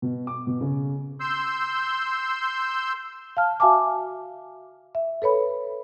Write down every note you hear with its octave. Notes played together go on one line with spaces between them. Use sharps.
B2
D6
B2
C#3
C6 E6 G6
F5 A5 F6
F#4 E5 F5 G#5 A5 D6
E5
A4 B4 C#5 B5